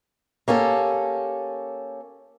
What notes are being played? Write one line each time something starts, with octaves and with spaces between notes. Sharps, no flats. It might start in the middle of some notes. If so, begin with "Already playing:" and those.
A#3 C#4 G4 A4